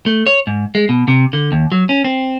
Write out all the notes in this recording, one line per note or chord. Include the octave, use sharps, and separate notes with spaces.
A3
C#5
G#2
G#3
B2
C3
D3
D#2
F#3
C#4
C4